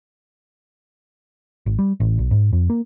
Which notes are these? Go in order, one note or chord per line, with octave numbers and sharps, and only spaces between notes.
G#1
G3
A1
B1
G#2
F2
A#3